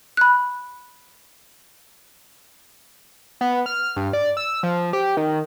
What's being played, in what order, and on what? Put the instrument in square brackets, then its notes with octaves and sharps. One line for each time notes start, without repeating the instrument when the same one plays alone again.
[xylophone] B5 F#6
[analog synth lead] B3
F6
G2
D5
E6
F3
G4
D#3